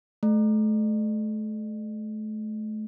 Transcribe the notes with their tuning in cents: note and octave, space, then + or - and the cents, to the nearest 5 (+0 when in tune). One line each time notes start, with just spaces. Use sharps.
A3 -35